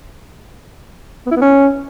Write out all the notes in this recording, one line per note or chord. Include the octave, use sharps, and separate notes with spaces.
B3
E4
B3
C#4